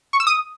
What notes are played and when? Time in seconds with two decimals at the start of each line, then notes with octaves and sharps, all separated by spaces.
0.13 C#6
0.20 E6
0.27 D#6